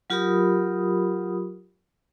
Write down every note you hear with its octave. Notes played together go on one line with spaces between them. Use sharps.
F#3 F4 G4 A#4 B5 D#6